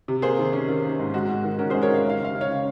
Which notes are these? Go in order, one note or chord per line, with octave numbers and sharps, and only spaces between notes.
C3
A#3 G#4 C5
D#3
C#4
D#3
A#3
G#2
G#3 F#4
G#2
D#3
C#4 F#4 A#4
G#4 C5
G#3
A#4 C#5
D#3 F5
G#3 F5
C#3 F5
C#3
C#5 F5
C#3